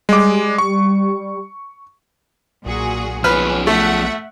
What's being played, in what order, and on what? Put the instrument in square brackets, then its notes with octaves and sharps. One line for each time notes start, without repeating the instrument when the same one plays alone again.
[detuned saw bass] G3 [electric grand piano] G#3 D6
[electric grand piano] C#6
[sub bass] B1 [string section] A#2 F#4 G#4
[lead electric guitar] F3 B3 [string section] C#4 [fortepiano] B4 F6
[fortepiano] A3 [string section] E5 F#5